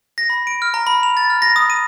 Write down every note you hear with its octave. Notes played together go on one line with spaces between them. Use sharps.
A#6
B5
D7
F6
A#5
B5
F7
A6
F6
A#6
D#6
D#7